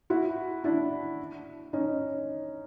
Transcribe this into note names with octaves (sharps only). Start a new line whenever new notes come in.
E4 F#4
D4 E4
C#4 D#4